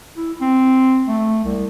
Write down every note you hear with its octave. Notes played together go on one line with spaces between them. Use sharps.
E4
C4
A3
C2